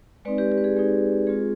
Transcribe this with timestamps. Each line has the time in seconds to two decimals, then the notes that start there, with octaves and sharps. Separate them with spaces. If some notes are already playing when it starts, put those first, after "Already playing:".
0.25 G#3 C4 D#4 B4 D5
0.38 G4 B4
0.52 G4
0.58 B4
0.64 G#4
0.77 G#3 C4 D#4 G#4
1.27 G#3 C4 F4 G#4